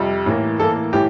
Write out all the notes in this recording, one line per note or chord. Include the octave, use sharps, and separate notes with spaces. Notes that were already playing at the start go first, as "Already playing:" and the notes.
Already playing: F2 C3 G3
A2 E3 A#3
A2 E3 A#3 A4
A2 E3 G4